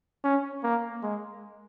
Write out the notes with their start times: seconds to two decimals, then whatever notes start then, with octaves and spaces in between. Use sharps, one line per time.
0.24 C#4
0.63 A#3
1.02 G#3